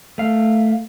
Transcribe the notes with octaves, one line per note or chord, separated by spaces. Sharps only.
A3 F5